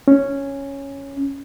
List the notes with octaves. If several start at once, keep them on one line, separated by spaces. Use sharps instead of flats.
C#4